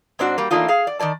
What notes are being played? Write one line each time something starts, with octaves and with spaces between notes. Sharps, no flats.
G#2 C4 D4 F#4
G3 A#3
E3 A3 A#3 D4 D#4 F4
G#4 F5
D5
D#3 E3 D5 A5